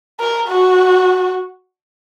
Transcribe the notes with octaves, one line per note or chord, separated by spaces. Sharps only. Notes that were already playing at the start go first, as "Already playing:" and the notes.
A#4
F#4